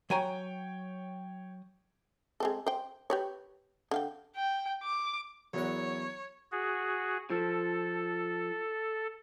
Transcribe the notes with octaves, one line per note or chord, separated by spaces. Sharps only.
F#3 C#5 G5 G#5 A#5
G#3 C4 A4
C5 G5
G4 B4 C#5
D3 F5 G5
G5
D6
E2 F#3 E4 A#4 C#5 F#5
F#4 G#4
F3 A4